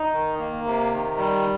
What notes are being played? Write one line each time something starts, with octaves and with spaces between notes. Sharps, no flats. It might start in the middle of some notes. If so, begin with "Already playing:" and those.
Already playing: D#4
D#3
A#3
C3
D#3
G3